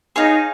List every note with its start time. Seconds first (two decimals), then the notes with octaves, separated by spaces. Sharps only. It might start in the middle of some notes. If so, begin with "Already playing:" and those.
0.16 D#4 G#4 C#5 F5